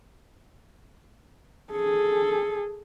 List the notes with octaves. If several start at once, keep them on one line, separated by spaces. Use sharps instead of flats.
G#4 A4